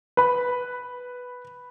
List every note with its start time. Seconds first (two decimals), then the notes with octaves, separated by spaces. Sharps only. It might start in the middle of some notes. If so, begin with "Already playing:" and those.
0.17 B4 B5